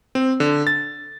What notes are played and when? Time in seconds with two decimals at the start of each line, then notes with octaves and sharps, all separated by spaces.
0.15 C4
0.40 D3
0.67 A6